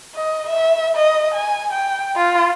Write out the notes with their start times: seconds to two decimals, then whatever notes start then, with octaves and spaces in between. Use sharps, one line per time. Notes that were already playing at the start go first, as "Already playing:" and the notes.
0.15 D#5
0.49 E5
0.95 D#5
1.34 G#5
1.72 G5
2.16 F4